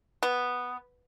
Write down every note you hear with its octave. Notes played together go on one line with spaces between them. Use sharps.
B3